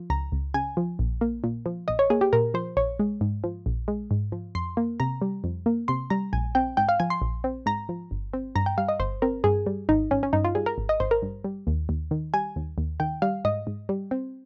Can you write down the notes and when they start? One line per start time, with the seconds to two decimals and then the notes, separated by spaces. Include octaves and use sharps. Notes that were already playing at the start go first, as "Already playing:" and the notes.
Already playing: F3
0.10 C#2 A#5
0.32 C#2
0.54 C#3 G#5
0.77 F3
0.99 A#1
1.21 A#3
1.44 A#2
1.66 F3
1.88 A#1 D#5
1.99 C#5
2.10 A#3 G#4
2.21 G4
2.33 A#2 A#4
2.54 F3 C5
2.77 A#1 C#5
2.99 G#3
3.21 G#2
3.44 F3
3.66 A#1
3.88 G#3
4.11 G#2
4.32 F3
4.55 F2 C6
4.77 A#3
5.00 C3 A#5
5.22 G3
5.44 F2
5.66 A#3
5.88 C3 C6
6.10 G3 A#5
6.33 A#1 G#5
6.55 C4 G5
6.77 G#2 G5
6.89 F5
7.00 F3 G#5
7.10 C6
7.22 A#1
7.44 C4
7.66 G#2 A#5
7.89 F3
8.11 G1
8.33 C4
8.55 G2 A#5
8.66 G5
8.78 G3 F5
8.89 D#5
9.00 G1 C5
9.22 C4 A#4
9.44 G2 G#4
9.66 G3
9.89 G#1 D#4
10.11 G#1 C#4
10.23 C#4
10.33 G2 D#4
10.44 F4
10.55 G3 G#4
10.66 A#4
10.78 G#1
10.89 D#5
11.00 G#1 C5
11.11 A#4
11.22 G2
11.45 G3
11.67 D#2
11.89 D#2
12.11 D#3
12.34 G3 G#5
12.56 D#2
12.78 D#2
13.00 D#3 G5
13.22 G3 F5
13.45 G#2 D#5
13.67 G#2
13.89 G3
14.11 C4